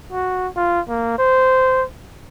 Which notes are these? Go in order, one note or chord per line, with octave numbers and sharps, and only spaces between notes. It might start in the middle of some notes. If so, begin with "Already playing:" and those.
F#4
F4
A#3
C5